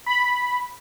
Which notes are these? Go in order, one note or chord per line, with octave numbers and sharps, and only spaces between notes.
B5